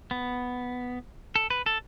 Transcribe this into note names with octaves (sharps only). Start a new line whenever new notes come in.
B3
A4
B4
A4